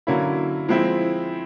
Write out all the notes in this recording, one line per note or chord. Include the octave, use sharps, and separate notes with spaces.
D3 F#3 A#3 C#4 E4
F3 G#3 C4 E4